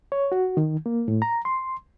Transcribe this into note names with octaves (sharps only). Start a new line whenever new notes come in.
C#5
F#4
D#3
A#3
A2
A#5
C6